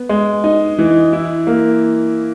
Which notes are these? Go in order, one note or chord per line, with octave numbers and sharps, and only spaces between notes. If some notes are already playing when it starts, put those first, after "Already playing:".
Already playing: B3
G#3
D#4
E3
E4
A#3